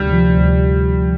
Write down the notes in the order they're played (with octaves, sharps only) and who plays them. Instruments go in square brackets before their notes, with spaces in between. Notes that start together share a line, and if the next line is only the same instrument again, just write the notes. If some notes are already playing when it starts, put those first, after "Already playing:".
Already playing: [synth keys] D2 C3 [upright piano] G3
[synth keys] F3
D2